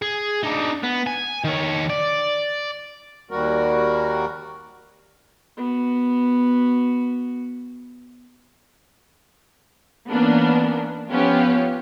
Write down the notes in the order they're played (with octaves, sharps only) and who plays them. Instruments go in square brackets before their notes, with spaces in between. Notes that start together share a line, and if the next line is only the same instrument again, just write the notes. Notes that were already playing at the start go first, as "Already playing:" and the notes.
[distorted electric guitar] G#4
D4 D#4
B3
G#5
D#3 C#5
D5
[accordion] D#2 G3 F#4 A#4
[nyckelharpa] B3 F#4
[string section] E3 A#3 B3 C#4 D4
F3 B3 C#4 F4 G4